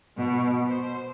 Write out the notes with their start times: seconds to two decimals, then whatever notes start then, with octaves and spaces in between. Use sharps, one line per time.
0.18 B2
0.66 C5